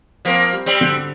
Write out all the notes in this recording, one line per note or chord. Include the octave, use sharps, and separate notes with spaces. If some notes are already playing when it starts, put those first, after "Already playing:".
F3 A#3 C4
G3
G3 C4
D3